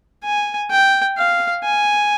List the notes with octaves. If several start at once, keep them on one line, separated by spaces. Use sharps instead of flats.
G#5
G5
F5
G#5